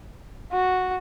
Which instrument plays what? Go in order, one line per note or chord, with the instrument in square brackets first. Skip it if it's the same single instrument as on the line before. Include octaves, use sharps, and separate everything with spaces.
[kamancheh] F#4